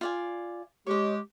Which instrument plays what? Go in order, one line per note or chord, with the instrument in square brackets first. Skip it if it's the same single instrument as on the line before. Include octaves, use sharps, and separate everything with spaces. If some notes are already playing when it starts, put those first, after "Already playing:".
[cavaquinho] F4 D5 G#5
[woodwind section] G#3 G4 [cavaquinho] C#5 D#5